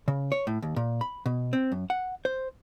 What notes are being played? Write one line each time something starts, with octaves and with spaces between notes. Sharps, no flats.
C#3
C#5
A2
D#2
A#2
B5
B2
C4
F#2
F#5
C5